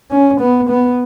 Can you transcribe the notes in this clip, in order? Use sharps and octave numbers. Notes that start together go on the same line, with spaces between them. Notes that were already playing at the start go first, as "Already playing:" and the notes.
C#4
B3
B3